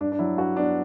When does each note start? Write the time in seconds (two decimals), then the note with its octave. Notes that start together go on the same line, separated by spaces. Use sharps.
0.01 G2 D4
0.12 D4
0.19 F#3 E4
0.37 G2 F#4
0.56 B3 D4